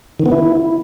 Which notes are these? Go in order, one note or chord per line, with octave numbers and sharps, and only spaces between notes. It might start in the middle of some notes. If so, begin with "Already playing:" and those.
D#3
B3
E4